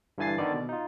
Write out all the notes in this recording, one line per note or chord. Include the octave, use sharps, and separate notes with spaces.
G2 D3 E3 G#5 A6 C7
D3 D#3 B3 D5
B2
D#4 F4